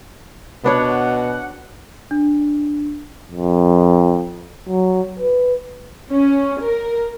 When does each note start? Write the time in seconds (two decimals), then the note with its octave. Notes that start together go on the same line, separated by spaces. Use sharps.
0.64 B2 B3 D4 C#5 F#5
2.11 D4
3.31 F2
4.69 F#3
5.19 B4
6.12 C#4
6.62 A#4